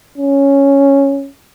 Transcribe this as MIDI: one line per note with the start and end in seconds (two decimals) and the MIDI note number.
0.18 1.29 61